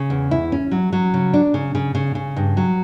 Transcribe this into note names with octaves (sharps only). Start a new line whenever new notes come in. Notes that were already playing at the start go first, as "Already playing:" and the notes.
Already playing: C#3
E2
E4
C#4
F#3
F#3
C#3
D4
C#3
C#3
C#3
C#3
G2
F#3